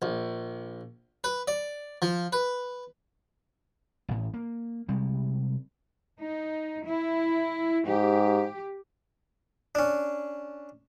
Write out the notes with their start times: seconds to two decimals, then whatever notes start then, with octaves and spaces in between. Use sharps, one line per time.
0.02 A#1
1.24 B4
1.48 D5
2.02 F3
2.33 B4
4.09 A1 A2
4.34 A#3
4.89 C3 G3 G#3
6.20 D#4
6.86 E4
7.86 G#2 G4
9.75 C#4 D4